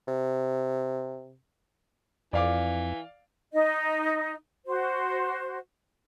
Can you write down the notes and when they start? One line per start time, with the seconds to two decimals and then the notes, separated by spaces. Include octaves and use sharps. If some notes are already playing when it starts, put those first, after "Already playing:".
0.07 C3
2.33 F2 E3 D5 F5 D6
3.53 D#4 D#5
4.67 F#4 C5